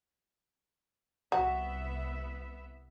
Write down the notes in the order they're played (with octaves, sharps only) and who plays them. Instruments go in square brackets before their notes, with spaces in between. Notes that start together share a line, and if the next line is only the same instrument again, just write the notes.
[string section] C2 B3 E5 [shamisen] F#4